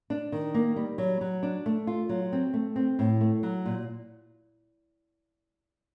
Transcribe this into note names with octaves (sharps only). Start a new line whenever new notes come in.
D4
D#3
A#3
G3
F#3
F#3
D4
A3
F4
F#3
C4
A3
C4
A2
A3
F#3
A#2